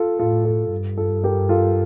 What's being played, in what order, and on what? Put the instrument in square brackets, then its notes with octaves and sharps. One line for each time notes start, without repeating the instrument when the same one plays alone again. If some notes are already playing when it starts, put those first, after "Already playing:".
Already playing: [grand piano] F4 A4
[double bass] A2 [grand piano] F4 A4
[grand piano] F4 A4
[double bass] G2
[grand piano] F4 A4
G4 A#4
F4 A4